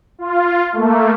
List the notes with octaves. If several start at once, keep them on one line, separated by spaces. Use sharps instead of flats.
F4
A3 A#3